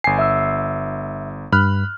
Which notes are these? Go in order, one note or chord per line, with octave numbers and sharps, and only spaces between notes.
G1 G#5 C7
E5 E6
G2 B5 F6 F#6